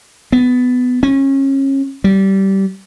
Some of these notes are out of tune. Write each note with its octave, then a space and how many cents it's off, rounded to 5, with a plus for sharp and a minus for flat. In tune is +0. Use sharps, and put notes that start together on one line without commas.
B3 +15
C#4 -30
G3 -20